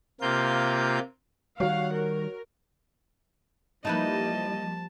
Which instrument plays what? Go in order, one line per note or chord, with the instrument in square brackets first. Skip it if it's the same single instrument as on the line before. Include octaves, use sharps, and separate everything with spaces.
[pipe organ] C3 A#3 F4 G6
[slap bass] D#3 G3 [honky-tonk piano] F#4 C#5 C7 [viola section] F5 F#5
[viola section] A#4
[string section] F3 G3 [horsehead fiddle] A#3 D#5 [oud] D#4 E4 B4 [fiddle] A5